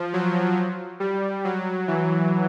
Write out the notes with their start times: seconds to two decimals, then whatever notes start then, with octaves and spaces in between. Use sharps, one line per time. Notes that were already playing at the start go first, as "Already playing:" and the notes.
Already playing: F3
0.13 F#3
1.00 G3
1.45 F#3
1.88 E3